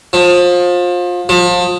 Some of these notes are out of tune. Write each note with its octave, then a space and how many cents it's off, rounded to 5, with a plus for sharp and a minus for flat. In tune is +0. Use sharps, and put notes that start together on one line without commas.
F3 +25
F3 +30